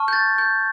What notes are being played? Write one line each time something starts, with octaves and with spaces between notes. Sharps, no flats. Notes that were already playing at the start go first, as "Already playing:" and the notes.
Already playing: A5 C#6 F6
G6
A6
G6